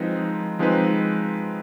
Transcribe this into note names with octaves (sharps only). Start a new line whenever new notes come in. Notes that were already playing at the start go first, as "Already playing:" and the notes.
Already playing: F3 G#3 C4 D#4 B4
F3 G#3 C4 D#4 B4